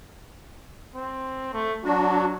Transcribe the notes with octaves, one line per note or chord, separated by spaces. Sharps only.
C4
A3
F#3 D4 F#4